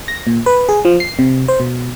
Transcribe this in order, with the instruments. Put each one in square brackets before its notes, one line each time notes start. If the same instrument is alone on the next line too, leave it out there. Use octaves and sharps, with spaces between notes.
[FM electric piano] A#6
A#2
B4
G#4
F3
C7
C3
C5
B2